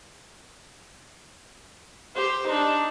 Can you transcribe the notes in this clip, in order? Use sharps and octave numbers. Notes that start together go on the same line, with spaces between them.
G4 C5
D4 D#4